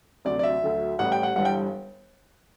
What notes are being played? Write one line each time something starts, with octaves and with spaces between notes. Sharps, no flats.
D2 C3 F#3 D5
D5
E5
D2 D3 F#3
A1 A2 G3 F#5
G5
F#5
G1 G2 E3 G3 F#5
G5